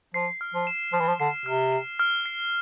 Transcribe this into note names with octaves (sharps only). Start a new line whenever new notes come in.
F3 C7
F6
F3
E7
F3 F6
E3
F3
D3 C7
C3 F6
E7
F6
C7